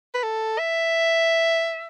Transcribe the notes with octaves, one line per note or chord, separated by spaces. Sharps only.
B4
A4
E5